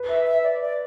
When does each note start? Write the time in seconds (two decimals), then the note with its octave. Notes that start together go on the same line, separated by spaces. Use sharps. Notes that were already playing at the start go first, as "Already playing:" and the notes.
Already playing: B4
0.09 E5
0.27 E5
0.43 D5
0.61 D5